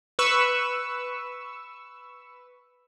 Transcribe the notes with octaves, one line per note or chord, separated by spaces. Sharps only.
B4 C#6 E6